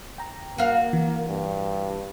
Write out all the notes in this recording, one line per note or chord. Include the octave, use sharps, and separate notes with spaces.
G5 A#5
A#3 F#4 F5
E3
G2